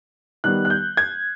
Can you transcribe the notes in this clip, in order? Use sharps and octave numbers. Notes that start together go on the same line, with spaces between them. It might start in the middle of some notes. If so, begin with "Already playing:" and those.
D#3 G3 B3 F#6
F#6
G6
G#6